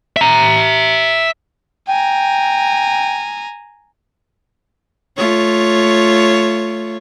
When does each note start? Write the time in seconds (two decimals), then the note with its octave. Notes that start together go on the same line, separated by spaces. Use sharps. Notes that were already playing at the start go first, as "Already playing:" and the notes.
0.17 E5 A#5
1.88 G5 G#5 A#5
5.18 A3 F4 C#5